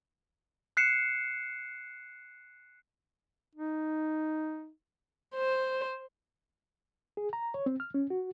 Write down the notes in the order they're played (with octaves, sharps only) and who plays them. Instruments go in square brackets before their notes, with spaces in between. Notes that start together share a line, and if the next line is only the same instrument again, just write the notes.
[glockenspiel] F#6 C7 C#7 E7
[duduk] D#4
[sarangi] C5
[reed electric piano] G#4
A#5
C#5
C4
F6
C#4
F#4